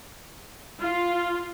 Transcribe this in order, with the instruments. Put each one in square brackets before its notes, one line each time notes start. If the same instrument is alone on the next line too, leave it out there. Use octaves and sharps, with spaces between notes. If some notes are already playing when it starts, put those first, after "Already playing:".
[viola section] F4